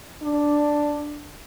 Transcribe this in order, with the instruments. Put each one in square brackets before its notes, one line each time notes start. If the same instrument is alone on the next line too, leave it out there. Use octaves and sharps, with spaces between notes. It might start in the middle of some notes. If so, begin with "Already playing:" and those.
[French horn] D4